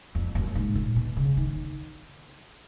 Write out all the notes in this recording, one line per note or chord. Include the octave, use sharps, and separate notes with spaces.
F2
F#2
G#2
A#2
B2
C#3
D#3